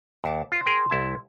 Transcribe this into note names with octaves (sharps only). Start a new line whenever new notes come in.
D#2 F#5 A5 D6
C4 F4 C5
G#4 A#4 G5
C2 E4 A5